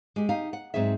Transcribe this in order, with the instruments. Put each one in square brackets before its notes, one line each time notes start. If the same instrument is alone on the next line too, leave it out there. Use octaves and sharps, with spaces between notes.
[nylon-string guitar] G#3 G4
D#4 G4 F5
F#5
G#2 F#3 C4 G#4 E5